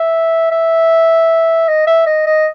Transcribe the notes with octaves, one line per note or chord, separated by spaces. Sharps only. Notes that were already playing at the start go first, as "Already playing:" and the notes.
Already playing: E5
E5
D#5
E5
D#5
D#5